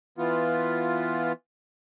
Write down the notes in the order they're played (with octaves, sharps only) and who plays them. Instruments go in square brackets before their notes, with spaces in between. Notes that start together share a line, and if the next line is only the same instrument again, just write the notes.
[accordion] E3 B3 F4